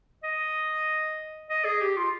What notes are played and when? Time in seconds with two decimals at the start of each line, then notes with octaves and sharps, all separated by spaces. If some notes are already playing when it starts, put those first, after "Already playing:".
0.24 D#5
1.50 D#5
1.65 G#4
1.81 G4
1.97 F4